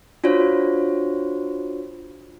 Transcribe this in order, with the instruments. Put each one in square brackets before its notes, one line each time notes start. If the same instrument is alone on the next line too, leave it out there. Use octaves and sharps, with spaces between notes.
[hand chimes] D4 F4 F#4 C5 C#5